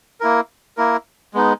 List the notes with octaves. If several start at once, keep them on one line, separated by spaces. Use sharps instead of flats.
A#3 E4 A#4
A#3 E4 A#4
G#3 B3 D#4